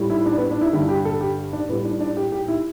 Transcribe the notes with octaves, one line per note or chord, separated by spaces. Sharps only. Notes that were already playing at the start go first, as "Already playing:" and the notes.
Already playing: A2 G3
E4
D4
B3
D4
E4
G2 D3 G3 E4
G4
A4
G4
D4
A2 G3 B3
D4
D4
G4
G4
E4